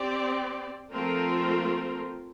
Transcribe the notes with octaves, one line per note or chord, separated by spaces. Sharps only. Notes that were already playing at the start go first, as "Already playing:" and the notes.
Already playing: C4 G4 D5
F3 A3 C4 F4 A#4